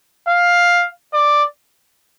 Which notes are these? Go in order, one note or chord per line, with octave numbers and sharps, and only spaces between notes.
F5
D5